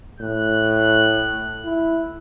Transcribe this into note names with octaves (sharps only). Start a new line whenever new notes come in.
A2 F#6
E4